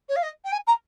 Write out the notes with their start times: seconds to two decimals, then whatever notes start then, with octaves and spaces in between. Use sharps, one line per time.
0.09 C#5
0.16 F5
0.23 D#5
0.45 G5
0.52 G#5
0.67 A#5